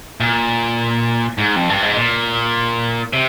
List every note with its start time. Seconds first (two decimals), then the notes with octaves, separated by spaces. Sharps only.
0.20 A#2
1.38 G#2
1.56 F2
1.69 G2
1.82 G#2
1.96 A#2
3.13 C3